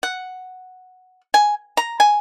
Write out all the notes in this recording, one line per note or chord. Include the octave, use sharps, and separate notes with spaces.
F#5
G#5
A#5
G#5